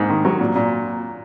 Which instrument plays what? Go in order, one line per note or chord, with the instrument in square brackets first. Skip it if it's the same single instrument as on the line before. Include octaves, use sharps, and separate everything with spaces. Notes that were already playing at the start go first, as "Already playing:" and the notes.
Already playing: [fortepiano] G#2 A#3
D#3
F#3
A#2
A#2